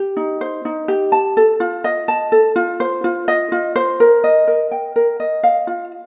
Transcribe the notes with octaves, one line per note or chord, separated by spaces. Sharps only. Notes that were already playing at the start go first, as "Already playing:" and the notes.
Already playing: G4
D#4
C5
D#4
G4
A5
A4
F4
D#5
A5
A4
F4
C5
F4
D#5
F4
C5
A#4
D#5
A#4
G5
A#4
D#5
F5
F4